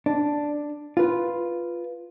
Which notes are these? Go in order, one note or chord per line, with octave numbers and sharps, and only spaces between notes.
D4
F4 B4